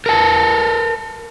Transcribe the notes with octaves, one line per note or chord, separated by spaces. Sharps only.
A#4 B4 A5